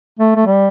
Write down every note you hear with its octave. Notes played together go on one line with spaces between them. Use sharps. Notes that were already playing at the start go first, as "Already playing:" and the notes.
A3
A3
G3